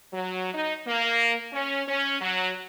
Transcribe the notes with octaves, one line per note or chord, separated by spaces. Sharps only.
F#3
D#4
A#3
C#4
C#4
F#3